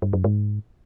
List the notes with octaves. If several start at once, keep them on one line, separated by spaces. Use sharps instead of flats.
G2
F#2
G#2